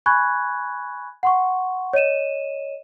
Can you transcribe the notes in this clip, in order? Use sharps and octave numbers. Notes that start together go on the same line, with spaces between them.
G#5 B5 C#6 F#6 G#6
F#5 C6 C#6
C#5 D#5 D#7 E7